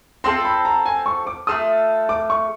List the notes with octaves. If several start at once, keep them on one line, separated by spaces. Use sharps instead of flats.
C4 F4 A4 C6
B5
A#5
G#5
C#6
D6
A3 C4 F4 A4 D#6
D6
C#6